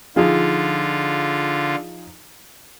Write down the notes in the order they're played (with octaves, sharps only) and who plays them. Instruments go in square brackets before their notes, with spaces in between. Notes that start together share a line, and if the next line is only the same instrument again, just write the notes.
[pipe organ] D3 F4 [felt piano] F3 D#4 G#4